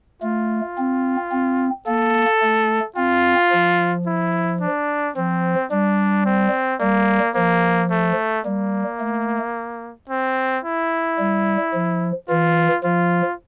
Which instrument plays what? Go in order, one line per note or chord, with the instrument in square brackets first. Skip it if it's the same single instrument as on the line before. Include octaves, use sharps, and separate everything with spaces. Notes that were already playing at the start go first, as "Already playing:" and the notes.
[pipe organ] A3 [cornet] F4
[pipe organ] C4
C4
[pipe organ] A#3 [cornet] A4
[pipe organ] A3
[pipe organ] C4 [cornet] F4
[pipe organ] F3
[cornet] E4
D4
[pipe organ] F3 [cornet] C4
[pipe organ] G3 [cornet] D4
[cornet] C4
[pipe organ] G3 [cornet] A#3
[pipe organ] F3 [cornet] A#3
[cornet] A3
[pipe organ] G3 [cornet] A#3
[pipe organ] A3
[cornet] C4
E4
[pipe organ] G3
F3
[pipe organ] E3 [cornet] F4
[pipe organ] F3 [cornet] F4